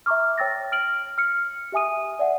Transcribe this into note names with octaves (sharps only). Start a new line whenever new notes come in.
E5 A#5 C#6 D6 F6
C#5 G5 E6 A6 A#6
F6 D7 F#7
F6 C#7
G4 E5 G#5 D#6 D#7
D5 E5 F#5